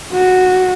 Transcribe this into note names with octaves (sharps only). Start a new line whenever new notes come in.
F#4